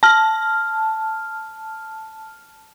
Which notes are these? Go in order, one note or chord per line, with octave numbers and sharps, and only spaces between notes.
A5 F6